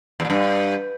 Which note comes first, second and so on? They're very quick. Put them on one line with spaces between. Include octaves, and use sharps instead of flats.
E2 A#2 G2